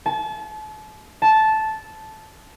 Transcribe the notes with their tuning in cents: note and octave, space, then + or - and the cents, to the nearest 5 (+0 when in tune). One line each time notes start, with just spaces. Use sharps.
A5 -35
A5 -10